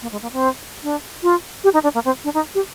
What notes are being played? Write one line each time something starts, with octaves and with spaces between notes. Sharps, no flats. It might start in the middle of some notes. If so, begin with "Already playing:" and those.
A#3
G#3
A#3
C4
D4
F4
G4
D#4
D4
A#3
C4
D4
D#4
G4